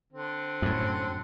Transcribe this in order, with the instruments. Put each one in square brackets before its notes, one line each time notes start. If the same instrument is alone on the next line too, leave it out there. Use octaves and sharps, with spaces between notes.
[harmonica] D3 C4
[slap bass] F#2 A2